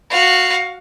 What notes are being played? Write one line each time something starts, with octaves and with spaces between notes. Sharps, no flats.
F#4 F5